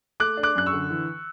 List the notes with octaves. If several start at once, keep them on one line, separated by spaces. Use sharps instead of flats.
A3 D6 F#6
D4
D6 F#6
F#2 F#6
C#6 E6
D3
E3